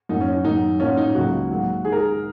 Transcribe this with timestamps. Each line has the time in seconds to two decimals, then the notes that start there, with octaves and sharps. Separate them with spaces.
0.09 F#2 F#3 A#3 D#4
0.21 C#4
0.33 D#4
0.44 F#2 D#3 F#3 A#3 D#4
0.80 A#2 F#3 A#3 C#4
0.97 D#4
1.15 C#2 C#3 F#3 A#3 F#4
1.50 G#2 F#3 A#3
1.85 G#2 D#3 G#3 G#4
1.92 A#4
2.00 G#4